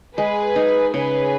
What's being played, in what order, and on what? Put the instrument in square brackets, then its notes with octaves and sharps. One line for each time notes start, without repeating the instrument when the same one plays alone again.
[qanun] G#3 [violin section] G#4 B4
[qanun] D#4
[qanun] C#3 [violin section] G#4 B4